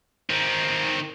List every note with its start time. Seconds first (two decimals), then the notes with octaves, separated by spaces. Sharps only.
0.30 D#3 C4